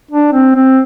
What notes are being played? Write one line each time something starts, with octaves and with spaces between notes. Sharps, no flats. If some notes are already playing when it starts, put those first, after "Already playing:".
D4
C4
C4